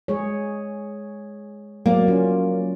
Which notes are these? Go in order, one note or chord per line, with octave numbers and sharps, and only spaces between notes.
G#3 G#4 C#5
F#3 A#3 D5
C#4 F4